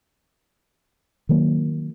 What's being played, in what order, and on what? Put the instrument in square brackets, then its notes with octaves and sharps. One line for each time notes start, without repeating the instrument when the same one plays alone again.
[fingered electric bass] D#3 F#3 A#3